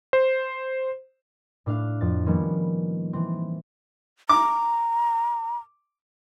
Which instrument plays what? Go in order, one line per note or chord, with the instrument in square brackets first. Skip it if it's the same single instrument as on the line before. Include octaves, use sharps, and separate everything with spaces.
[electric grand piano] C5
[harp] A2 D4 F5 F#6
F2 A6
D#3 F3 G3 A#3 B3 C#4
E3 C4
[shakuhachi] A#5 [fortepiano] D6